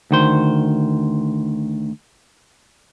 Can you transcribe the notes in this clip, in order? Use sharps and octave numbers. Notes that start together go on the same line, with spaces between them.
D2 D#3 C5